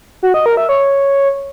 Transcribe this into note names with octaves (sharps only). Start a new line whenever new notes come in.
F#4
D#5
A#4
E5
C#5